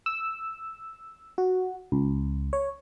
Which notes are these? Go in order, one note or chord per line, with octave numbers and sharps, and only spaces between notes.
E6
F#4
C#2
C#5